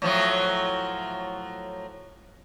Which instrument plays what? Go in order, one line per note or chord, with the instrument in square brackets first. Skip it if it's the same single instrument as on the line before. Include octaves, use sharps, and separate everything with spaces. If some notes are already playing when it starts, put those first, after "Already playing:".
[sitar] A2 F3 F#3